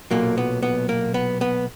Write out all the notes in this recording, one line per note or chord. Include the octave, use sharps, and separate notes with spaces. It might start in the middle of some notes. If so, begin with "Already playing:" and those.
B1 A#2 F#3 A#3
B3
B3
A#3
B3
B3